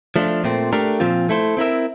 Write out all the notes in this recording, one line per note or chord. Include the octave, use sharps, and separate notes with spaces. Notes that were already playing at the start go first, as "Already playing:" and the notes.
F3 A3 D4 F4
A#2 A3 C4
A3 D4 G4 A#4
A#2 F3 C4 F4
A3 E4 A4 C5
C4 E4 A#4 E5